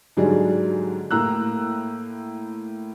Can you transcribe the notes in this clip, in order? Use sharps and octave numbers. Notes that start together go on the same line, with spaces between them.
G#2 D3 F#3 G3 G#4
A2 A#3 A#5 E6 F#6